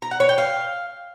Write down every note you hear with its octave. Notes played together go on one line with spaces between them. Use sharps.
A#5
F#5
C#5
G5
F5